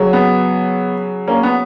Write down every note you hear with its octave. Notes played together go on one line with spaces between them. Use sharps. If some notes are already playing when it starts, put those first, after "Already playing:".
Already playing: C#3 F#3
B3
A#3 C#4
B3